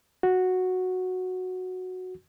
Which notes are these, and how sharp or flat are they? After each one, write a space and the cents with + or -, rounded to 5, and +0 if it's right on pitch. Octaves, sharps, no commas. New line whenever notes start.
F#4 -5